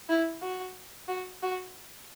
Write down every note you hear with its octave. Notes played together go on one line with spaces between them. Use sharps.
E4
F#4
F#4
F#4